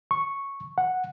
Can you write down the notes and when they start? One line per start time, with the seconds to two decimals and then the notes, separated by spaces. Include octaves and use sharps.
0.11 C#6
0.78 F#5